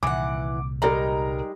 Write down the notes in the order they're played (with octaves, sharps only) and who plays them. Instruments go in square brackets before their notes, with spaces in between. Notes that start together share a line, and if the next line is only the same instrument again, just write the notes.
[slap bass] C2 A#2 D#3 [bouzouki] E3 F#5 [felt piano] D6
[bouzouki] G3 G#3 D#4 [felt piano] A#4 A#5